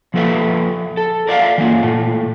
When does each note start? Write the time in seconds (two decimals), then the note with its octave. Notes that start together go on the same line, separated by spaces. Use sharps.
0.14 F3 A#3 A4 B4 E5
0.97 A4
1.27 A#4 D5 E5 F5
1.58 E3 A#3 F4
1.83 A#2 A3